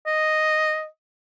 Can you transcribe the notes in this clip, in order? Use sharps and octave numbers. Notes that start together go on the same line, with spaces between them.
D#5